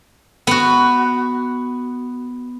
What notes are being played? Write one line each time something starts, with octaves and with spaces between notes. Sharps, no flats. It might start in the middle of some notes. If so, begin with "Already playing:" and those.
B3 F#4